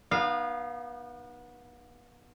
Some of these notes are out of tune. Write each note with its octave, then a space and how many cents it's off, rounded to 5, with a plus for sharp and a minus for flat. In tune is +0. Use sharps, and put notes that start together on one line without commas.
B3 -30 D#4 -30 F5 +0